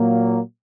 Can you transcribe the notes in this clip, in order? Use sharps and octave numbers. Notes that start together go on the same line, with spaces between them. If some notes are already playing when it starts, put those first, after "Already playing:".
Already playing: A#2 F#3 A#3